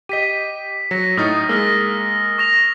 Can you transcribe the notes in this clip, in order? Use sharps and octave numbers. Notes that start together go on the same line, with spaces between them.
G4 D#5 B6 D#7
F#3 A#6 C#7
A2 D#4 D#6 F6 A6
G#3 A#3 E6 F6 A#6
C#6 A#6 F7